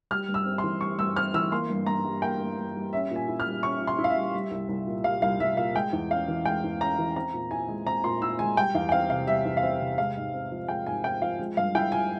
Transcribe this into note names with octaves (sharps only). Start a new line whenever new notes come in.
G3 F6
G2
E6
C4
C6
E3
G3 C#6
G2 E6
C4 F6
E3 E6
A#3 C6
G2
G2 A#5
G3
A#3 G5
G2
G2
G3
C#4 E5
A#2 G#5
E4
F6
G3
C#4 C#6
A#2
C6
E4
F5
E5
G3
G3
C2
C2
A#2
G3 F5
C2 F5
C2 E5
A#2 F5
G#3 G5
E2
C#4 F5
E3
G#3 G5
E2
C#4 A#5
E3
C4 A#5
A#2
E4 G#5
G#3
C4 A#5
A#2 C6
E4 E6
G#3 G#5
G3 G5
E2 F5
G5
C4 F5
C3 F5
G3 E5
E2
F5
C4 E5
C3
G#3 F5
G#2
C4
F3
G#3 G5
G#2 G#5
C4 G5
F3 F5
G#3
G2 F5
E4 G5
F3 G#5